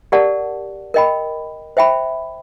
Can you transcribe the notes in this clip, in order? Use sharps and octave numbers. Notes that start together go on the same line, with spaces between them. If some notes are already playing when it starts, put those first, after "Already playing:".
G4 A#4 D5 F#5 A5
A#4 D#5 G5 B5
C5 E5 G5 B5